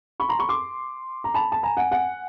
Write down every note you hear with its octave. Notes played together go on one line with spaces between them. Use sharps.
B5 C#6
A#5 C6
B5 C#6
C6 D6
A#5
A5 B5
A5
G#5 A#5
F#5 G#5
F#5 G#5